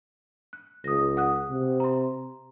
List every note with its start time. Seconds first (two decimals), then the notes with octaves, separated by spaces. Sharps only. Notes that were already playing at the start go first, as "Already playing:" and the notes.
0.53 F#6
0.84 C#2 D#6 A#6
1.17 F#5 D#6 F#6
1.50 C3
1.80 A#5 C6